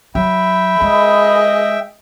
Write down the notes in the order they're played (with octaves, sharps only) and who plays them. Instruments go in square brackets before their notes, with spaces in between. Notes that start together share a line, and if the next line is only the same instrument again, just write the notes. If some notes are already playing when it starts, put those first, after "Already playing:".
[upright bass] F#3 [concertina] E5 G5 [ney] B5
[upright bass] G#3 [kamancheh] G#4 D#5